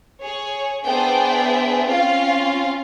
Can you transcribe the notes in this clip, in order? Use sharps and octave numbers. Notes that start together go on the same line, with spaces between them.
G#4 C#5
B3 D4 G#4 C5 E5 G5
C4 C#4 F4 F5